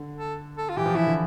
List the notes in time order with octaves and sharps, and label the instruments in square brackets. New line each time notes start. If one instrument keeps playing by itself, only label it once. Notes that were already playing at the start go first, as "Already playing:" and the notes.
Already playing: [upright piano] D3
[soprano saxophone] A4
A4
F4
[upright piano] E3 [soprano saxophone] G4
[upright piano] F3
[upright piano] E3 [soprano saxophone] E4
[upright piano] D3